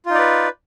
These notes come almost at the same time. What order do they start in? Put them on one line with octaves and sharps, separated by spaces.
F4 D#4 D5 B4